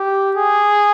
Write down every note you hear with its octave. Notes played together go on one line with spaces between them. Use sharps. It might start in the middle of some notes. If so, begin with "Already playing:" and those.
Already playing: G4
G#4